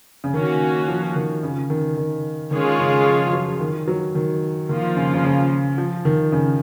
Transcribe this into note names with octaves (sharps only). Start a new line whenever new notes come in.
C#3
D#3 A#3 C#4 F#4
F3
D#3
C#3
D#3
D#3
D#3 G#3 C#4 F4 G#4 C#5
C#3
F3
F3
F#3
D#3
F#3
D#3
D#3 F3 A#3 F4
C#3
C#3
C#3
F3
D#3
C#3